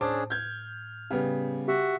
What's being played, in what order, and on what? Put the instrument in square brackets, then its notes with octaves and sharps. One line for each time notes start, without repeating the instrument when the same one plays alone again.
[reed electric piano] A2 [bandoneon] C#4 D4 G#4 [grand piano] C5 A5 D6
[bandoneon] F6 [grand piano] G6 G#6
[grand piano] C#3 G3 B3
[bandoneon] F#4 E5 F#5 [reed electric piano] G4